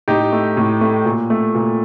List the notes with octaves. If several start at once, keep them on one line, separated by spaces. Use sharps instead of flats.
A2 D#4 G4
A3
A2
A3
A#2
A3
A#2